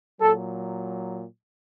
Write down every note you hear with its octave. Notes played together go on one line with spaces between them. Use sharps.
A#2 F#3 A4